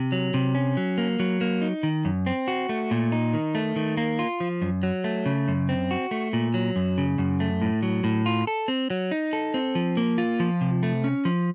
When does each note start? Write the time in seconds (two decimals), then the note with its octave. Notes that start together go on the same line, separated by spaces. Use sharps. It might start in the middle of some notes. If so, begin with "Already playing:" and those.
Already playing: C3
0.12 F#3
0.34 C3
0.55 C#4
0.77 F#3
0.98 A#3
1.20 F#3
1.41 A#3
1.62 D#4
1.83 D#3
2.05 F#2
2.26 C4
2.48 F#4
2.69 A3
2.91 A#2
3.12 D#4
3.33 D#3
3.55 A3
3.76 D#3
3.97 A#3
4.19 F4
4.40 F3
4.62 F#2
4.83 F#3
5.04 A3
5.26 C#3
5.48 F#2
5.69 C4
5.91 F#4
6.11 A3
6.33 A#2
6.54 F#3
6.76 F#2
6.98 C#3
7.18 F#2
7.40 A3
7.62 A2
7.83 F#3
8.04 A2
8.26 F4
8.47 A4
8.68 C4
8.90 F#3
9.11 D#4
9.33 A4
9.54 C4
9.75 F3
9.97 A#3
10.18 F4
10.40 F3
10.61 C3
10.83 A3
11.04 C#4
11.25 F3